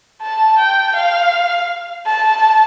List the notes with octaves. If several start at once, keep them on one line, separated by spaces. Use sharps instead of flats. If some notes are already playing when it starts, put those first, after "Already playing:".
A5
G5
F5
A5